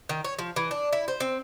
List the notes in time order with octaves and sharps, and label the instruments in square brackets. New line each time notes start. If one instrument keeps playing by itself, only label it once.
[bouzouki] D#3
C#5
F3
E3
D4
E4
C5
C4